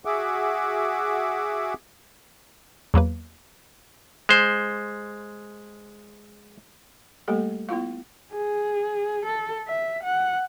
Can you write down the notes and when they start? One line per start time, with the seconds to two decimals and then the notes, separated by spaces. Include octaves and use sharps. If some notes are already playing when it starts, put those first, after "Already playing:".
0.05 F#4 G#4 E5 F#5 D6
2.94 E2 F#3 A#3 B4
4.29 G#3 C5
7.28 G3 A3 A#3 G4 A4
7.69 B3 E4 F4 F5
8.34 G#4
9.25 A4
9.68 E5
10.03 F#5